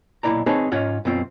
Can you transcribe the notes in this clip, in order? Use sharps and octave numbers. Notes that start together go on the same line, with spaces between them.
B1 A#2 C4 E4 D5 A#5
C4 D#4 G#4 B4 C#5 A5
G#2 C#4 F4 F#5
F#2 B2 C4 F4